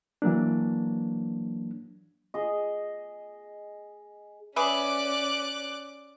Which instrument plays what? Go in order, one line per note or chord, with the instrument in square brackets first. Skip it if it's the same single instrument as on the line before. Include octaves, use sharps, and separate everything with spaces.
[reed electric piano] E3 F#3 A#3 D4
[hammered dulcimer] G#4 D#5
[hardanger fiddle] C#4 D5 [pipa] G#4 B4 E5 [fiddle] D6 F#6